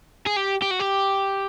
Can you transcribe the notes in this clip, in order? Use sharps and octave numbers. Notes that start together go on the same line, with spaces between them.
G#4
G4
G4
F#4
G4